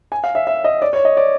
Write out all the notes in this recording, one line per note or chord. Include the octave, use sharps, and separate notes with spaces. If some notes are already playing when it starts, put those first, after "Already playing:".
G#5
F5
E5
E5
D#5
D5
C#5
D#5
D5